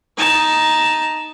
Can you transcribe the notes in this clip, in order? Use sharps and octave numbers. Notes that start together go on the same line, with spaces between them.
D#4 A5